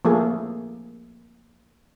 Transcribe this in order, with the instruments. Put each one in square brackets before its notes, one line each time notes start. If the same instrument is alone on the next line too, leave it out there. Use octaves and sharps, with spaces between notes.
[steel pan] F3 A3 A#3 G#4 A4